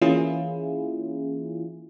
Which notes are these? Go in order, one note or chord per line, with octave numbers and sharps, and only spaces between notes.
E3 A#3 C#4 E4 F4 G#4